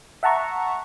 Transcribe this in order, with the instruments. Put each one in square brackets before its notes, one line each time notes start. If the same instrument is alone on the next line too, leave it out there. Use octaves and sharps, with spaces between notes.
[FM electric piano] E5 F#5 A5 A#5 C#6